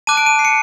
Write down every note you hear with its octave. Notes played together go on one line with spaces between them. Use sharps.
A5 D6 F#6 D#7
D7
D#7
C7
C#7